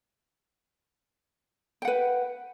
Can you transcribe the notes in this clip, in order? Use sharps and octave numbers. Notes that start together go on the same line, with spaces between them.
B4 F#5 G5